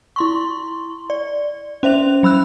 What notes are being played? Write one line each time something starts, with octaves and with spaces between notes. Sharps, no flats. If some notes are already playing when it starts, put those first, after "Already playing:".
E4 C6 C#6
D5
C#4 C5 E5 F7
F#3 B5 E6 F#6